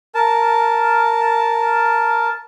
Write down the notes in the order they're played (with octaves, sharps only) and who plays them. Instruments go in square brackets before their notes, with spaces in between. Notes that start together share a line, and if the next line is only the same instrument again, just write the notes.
[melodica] A#4 A5